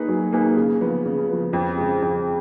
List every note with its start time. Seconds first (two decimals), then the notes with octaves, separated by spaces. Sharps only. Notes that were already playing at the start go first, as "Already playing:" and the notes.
Already playing: A#3 D#4 G#4 B4
0.08 F#3
0.32 A#3 D#4 G#4 B4
0.57 C#3
0.81 F3 B3
1.06 C#3
1.29 F3 B3
1.53 F2
1.78 C#3 G#3
2.02 F2